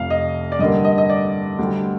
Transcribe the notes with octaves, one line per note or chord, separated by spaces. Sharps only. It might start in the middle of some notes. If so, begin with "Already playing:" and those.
Already playing: F1 F2 C3 F5
D#5
D5
G2 D3 G3 A#3 D#5
D#5
D#5
D5
D2 D3 G3